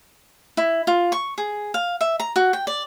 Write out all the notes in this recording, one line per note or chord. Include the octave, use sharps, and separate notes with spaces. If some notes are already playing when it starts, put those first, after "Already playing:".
E4
F4
C#6
G#4
F5
E5
A#5
F#4
G5
D5